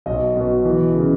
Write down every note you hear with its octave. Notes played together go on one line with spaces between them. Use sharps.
B1 D#5
B2
E3
C#3